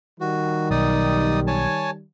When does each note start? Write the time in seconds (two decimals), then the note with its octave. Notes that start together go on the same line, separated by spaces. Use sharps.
0.21 D#3 G3 F#4
0.71 B1 D#4 D5 D#6
1.47 C#5 G#5 A5